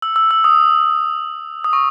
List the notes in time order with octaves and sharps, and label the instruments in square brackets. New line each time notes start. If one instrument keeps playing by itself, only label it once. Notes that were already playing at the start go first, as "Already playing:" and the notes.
[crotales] E6
E6
E6
D#6
D#6
C#6